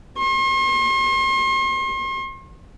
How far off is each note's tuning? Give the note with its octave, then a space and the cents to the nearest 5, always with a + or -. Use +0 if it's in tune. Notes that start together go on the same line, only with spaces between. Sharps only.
C6 +45